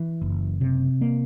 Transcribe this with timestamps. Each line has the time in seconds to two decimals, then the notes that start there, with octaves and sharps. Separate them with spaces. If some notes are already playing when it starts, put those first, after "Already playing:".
Already playing: E3
0.21 F#1
0.61 C3
1.01 A#3